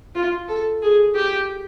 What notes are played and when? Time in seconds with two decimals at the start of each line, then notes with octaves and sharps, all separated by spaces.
0.15 F4
0.48 A4
0.82 G#4
1.15 G4